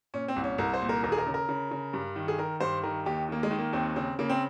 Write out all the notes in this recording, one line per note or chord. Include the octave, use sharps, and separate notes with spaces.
A#2 C#4
C4
C2
C#4
C2 A#4
C5
A#2
A#4
D#2 A#4
G#4
A#4
C#3
A#4
C#3
C#3
G2
D#3
G#4
D#3 A#4
G2 C5
D#3 A#4
D#2 G4
D#3 A#3
G#3
D#3
A#3
D#2 C4
C#3 C4
C#3 A#3
C4